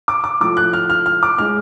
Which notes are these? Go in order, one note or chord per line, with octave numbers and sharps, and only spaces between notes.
D6
D6
A2 F3 A3 D6
F#6
F6
F6
F6
D6
A2 G#3 F6